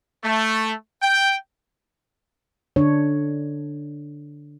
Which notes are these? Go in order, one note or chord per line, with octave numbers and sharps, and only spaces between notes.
A3
G5
D3 D4 C#5